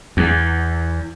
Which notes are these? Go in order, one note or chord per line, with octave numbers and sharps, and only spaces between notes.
E2